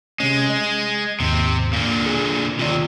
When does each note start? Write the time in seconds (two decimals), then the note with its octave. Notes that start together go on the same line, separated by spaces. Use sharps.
0.20 C3 G#3 C#4
0.50 D#5
1.20 D#2 G#2 C3
1.73 A#2 D3 A#3
2.06 G#4
2.59 D#2 C3 F4 D5